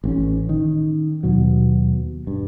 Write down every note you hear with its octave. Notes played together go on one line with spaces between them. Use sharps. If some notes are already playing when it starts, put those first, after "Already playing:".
A1 C4 C#4
D#3
D#2 B2 F#3
G2